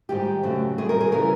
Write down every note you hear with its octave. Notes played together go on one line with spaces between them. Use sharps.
G#2 D#3 G3 G4
F#2 C#3 F#3 A3
F#2 D#3 G3 G#4
A#4
G#4
C#3 E3 G3 A#4